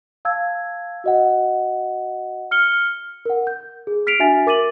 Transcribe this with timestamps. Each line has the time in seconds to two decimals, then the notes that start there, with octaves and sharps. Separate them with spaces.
0.25 F5 A5 E6 G#6
1.04 F#4 D#5 F#5
2.51 F6 C#7 G7
3.25 A#4 F#5
3.47 G6
3.87 G#4
4.07 F6 B6 C7 D7 F7
4.19 D4 F#4 E5 G#5 A6
4.47 A#4 D6 A6 D#7 F#7